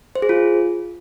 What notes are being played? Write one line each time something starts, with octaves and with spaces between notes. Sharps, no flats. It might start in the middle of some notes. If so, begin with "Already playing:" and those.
C5
G#4
F4